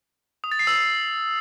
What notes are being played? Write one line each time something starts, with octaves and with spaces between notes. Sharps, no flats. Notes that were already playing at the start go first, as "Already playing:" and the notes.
D#6
A6
C7
E6
C7